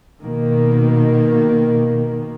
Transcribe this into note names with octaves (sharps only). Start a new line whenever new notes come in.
B2 D#3 A#3